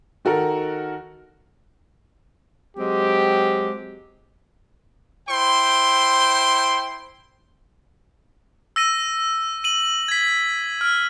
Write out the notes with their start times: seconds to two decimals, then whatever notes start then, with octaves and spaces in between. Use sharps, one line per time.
0.25 D#3 F#4 A4 A#4
2.77 F#3 G#3 C4 G4
5.28 E4 C5 G5 C6
8.76 E6 A#6 D#7
9.64 D#7 F#7
10.08 G#6 B6
10.81 F6